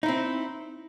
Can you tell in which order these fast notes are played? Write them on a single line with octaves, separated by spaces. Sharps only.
D#4 E4 C4